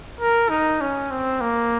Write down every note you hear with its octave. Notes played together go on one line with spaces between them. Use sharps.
A#4
D#4
C#4
C4
A#3